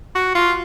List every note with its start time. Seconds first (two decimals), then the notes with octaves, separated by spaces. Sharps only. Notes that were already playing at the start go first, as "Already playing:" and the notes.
0.15 F#4
0.35 F4